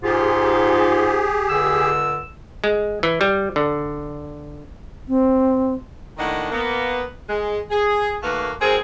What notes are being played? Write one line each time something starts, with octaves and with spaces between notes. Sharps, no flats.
G#2 F4 G4 G#4
C#2 D3 E6
G#3
E3
G3
D3
C4
A2 D#3 A#3 D4 D#5 F#5
A#3 B3
G#3
G#4
D#2 A3 A#3 F#4 B4 F5
F#3 G#3 C4 G#4 A#4 C5